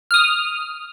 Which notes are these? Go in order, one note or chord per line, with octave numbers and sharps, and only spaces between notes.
D#6 F6